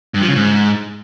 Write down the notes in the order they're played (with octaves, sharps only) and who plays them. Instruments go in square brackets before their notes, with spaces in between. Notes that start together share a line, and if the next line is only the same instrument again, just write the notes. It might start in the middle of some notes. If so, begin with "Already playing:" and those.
[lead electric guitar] G2
F3
C#3
G#2